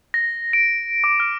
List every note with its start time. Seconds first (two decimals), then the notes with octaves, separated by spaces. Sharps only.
0.14 A#6
0.53 D7
1.04 D6
1.20 F6